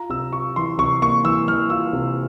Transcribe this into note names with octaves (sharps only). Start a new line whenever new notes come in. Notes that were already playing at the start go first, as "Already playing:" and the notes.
Already playing: F4 A#5
C3 E6
F4 C#6
E3 C6
C3 C#6
A#3 C#6
E3 E6
E3 F6
F4 E6
C3